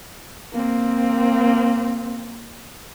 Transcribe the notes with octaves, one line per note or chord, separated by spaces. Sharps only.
A#3 C4